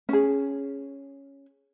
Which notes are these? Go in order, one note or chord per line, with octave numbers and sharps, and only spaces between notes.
C#4 G#4